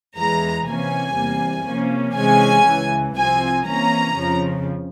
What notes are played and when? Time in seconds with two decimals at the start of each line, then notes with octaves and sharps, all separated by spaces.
0.16 E2 E3 G#3 A#5
0.67 C3 E3 A#3 C#4 G#5
1.16 E2 C3 G3 A#3
1.66 C3 F3 A#3 C#4
2.16 C3 E3 G#3 C#4 G#5
2.66 C#2 C#3 E3
3.15 C2 C3 F3 C4 G#5
3.66 C3 E3 A#3 C#4 A#5
4.17 F2 C#3 F3